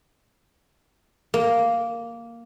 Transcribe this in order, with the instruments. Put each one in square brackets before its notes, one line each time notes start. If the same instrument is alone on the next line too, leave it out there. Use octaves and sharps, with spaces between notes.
[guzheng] A#3